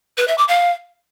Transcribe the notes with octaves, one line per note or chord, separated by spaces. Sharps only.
B4
E5
D6
F5